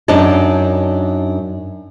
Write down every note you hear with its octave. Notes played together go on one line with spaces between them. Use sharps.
F#2 D4 D#4 D#5 A5